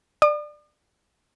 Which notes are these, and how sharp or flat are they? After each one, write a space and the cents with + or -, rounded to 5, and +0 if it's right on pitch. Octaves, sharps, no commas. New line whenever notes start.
D5 +15 D#6 -45